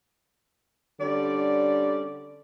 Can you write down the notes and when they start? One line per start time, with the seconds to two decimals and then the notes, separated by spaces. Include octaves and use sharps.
1.01 D3 G3 C#4 D5